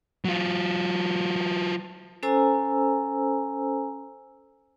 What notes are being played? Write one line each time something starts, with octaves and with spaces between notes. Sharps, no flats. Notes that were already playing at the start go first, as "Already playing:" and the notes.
F#3 F4
C#4 A4 C5 G#5 A#5 E6